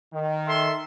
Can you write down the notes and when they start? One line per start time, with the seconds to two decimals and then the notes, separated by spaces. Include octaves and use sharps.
0.13 D#3
0.48 A4 E5 C6